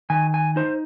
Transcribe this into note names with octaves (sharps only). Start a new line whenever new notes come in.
D#3 G#5
G#5
D#4 C5